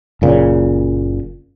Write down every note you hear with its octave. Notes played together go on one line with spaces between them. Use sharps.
F#1 A#2 C#3